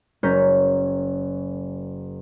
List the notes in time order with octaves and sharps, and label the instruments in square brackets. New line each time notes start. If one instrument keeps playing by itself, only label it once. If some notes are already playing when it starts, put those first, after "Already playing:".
[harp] F#1 C#4 A#4 G6 B6 C#7